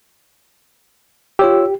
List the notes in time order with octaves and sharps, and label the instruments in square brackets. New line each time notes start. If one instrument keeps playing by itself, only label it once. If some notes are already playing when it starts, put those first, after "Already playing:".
[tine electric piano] F4 C#5 E6 [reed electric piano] G4